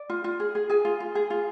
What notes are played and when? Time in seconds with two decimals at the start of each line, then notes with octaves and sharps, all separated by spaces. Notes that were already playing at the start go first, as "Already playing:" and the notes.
Already playing: D5
0.10 F4
0.24 F4
0.40 G#4
0.55 G#4
0.70 G#4 G#5
0.85 F4
1.00 F4
1.15 G#4
1.30 F4